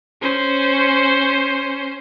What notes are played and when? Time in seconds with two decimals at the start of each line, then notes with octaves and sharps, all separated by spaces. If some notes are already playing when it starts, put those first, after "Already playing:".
0.22 C#4 C5